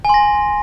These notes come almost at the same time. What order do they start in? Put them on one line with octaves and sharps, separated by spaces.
G#5 C6 A#6